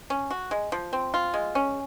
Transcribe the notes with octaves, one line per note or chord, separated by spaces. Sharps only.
C#4
F#4
G#3
F3
C4
F4
G#3
C#4